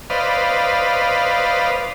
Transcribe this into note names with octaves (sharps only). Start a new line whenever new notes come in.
B4 C5 D5 D#5 F5